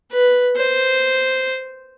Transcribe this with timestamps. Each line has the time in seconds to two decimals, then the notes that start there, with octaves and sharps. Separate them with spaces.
0.12 B4
0.57 C5